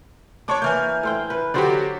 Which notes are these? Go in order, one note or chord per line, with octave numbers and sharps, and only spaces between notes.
D4 C5 C#5 C#6 D6
E3 A#3 G#5 F6 G6
A2 C5 G5
B4
D3 F#3 F#4 G4 C5 D5